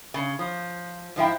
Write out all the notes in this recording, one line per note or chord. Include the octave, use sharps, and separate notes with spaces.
C#3
F3
G#2 F3 E4 G5